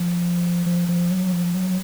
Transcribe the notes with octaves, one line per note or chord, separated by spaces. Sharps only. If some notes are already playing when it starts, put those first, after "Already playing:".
Already playing: F3
F3
F3
F#3
F3
F#3